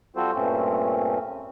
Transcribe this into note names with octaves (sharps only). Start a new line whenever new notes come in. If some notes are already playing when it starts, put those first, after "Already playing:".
G3 C4 F4 F#4 A4 C5
G2 A#2 A3 C4 C#4